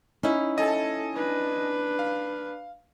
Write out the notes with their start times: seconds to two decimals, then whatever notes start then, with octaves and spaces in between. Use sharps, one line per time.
0.23 C#4 D#4 E4
0.58 A4 D#5 G#5 A5
1.13 D4 B4
1.99 F5